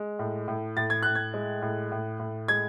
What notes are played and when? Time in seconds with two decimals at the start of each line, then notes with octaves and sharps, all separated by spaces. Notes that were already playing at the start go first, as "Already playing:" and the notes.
Already playing: G#3
0.19 A2
0.48 A2
0.77 A2 A6
0.90 G#6
1.03 A2 F#6
1.15 G#6
1.34 G#3
1.62 A2
1.92 A2
2.20 A2
2.48 G#3 G#6